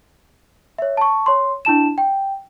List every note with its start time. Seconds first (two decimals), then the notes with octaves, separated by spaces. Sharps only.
0.78 C#5 E5
0.97 A5 C#6
1.26 C#5 C6
1.65 D4 E4 A5 E7
1.98 G5